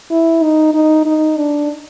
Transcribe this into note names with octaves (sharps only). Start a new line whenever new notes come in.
E4
D#4
D#4
D#4
D4